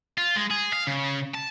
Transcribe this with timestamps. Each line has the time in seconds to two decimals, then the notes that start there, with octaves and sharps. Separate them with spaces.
0.18 F4
0.36 G#3
0.51 G#4
0.73 F5
0.87 C#3
1.35 A5